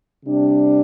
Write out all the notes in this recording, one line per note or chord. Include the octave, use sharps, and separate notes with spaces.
C3 G3 D4